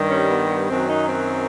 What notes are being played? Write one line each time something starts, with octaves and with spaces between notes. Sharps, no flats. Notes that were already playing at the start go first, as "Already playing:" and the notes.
Already playing: G2 D#3 G3
C#4
B3
B3
F#2 D#3 F#3 C4
D#4
C4